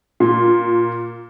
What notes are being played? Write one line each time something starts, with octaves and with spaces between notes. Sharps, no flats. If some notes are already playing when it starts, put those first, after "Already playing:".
A#2